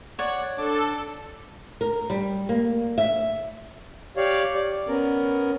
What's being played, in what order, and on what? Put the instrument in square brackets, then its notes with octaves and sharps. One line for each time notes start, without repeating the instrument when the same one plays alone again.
[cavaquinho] C#5 [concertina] D5 F#5
[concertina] D4 D6 [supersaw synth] A4
[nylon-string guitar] A#4
G3
A#3
E5
[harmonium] G4 C#5 D5 F5
D5
B3 C#4 A#4